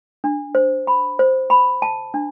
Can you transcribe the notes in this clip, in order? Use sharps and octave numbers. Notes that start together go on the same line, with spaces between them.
D4
C5
B5
C5
B5
A5
D4